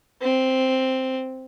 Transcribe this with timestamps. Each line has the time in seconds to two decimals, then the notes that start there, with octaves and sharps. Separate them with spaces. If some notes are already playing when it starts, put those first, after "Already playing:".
0.21 C4